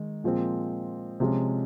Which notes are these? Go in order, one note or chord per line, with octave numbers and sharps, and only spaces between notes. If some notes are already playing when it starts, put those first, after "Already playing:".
Already playing: D#3 G#3
A#2 F3 G#3 C4
C3 F3 G#3 C#4 F4